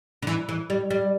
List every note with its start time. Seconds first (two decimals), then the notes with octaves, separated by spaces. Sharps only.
0.22 D3
0.27 E3
0.49 E3
0.70 G3
0.90 G3